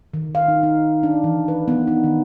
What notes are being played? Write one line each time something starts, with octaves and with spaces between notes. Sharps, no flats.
D#3
F5
D#4
D#4
D4
E3
B4
B3
D#4
D#3